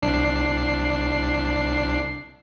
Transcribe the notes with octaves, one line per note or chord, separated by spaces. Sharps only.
C2 D4 C7